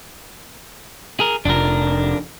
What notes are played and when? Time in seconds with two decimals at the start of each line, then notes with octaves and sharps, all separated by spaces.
1.20 G#4 A#4
1.45 F1 D4 A#4